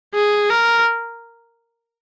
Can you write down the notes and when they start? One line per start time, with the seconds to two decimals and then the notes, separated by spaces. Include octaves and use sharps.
0.15 G#4
0.50 A#4